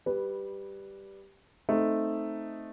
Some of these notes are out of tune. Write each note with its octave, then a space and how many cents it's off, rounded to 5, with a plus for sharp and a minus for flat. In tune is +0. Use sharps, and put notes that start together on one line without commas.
G3 +0 B4 +0
A3 +0 C4 +0 D#4 +0